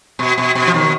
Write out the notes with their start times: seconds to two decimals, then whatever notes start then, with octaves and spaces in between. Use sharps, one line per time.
0.19 B2
0.38 B2
0.55 B2
0.67 F3
0.74 B2 D#3